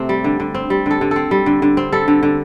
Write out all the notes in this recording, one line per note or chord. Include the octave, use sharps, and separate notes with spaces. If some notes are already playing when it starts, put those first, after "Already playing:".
Already playing: C3 A3 C4
G3
D3
D3
C4
G3
D3 A4
D3
C4 A4
G3
D3
D3
C4
G3 A4
D3
D3